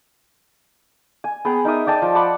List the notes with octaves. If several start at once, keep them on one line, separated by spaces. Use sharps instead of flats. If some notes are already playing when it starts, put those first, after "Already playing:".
G#5
B3 G#4 G5 A#5
D#4 A#4 E5 D#6
D5 G5 A5 D#6
F3
F#5 A5 B5 D6